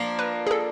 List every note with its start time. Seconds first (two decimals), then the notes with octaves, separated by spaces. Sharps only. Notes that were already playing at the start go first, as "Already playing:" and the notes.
Already playing: F3 A#3 D4
0.19 B4
0.47 G#4
0.51 A4